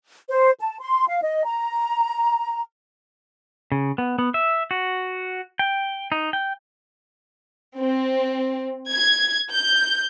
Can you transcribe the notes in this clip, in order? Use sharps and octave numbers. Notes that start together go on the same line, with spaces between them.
C5
A5
C6
F5
D#5
A#5
C#3
B3
B3
E5
F#4
G5
D#4
G5
C4
G#6
G6